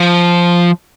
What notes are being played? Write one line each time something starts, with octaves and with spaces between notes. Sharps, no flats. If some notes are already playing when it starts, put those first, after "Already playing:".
Already playing: F3